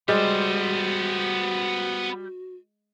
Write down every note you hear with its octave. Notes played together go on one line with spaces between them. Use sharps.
G3 G#3 B3 F#4 C5